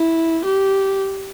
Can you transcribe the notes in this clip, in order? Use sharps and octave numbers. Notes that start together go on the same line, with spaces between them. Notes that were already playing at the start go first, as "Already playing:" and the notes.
Already playing: E4
G4